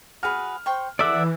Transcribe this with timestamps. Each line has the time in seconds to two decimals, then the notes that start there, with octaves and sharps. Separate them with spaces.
0.23 F#4 G#4 B4 F6
0.66 C5 G5 C#6
0.99 E3 A4 D5 E5 F#5 D6 E6